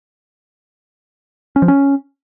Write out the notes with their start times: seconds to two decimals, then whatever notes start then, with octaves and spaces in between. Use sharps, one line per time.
1.56 C#4
1.62 F3
1.68 C#4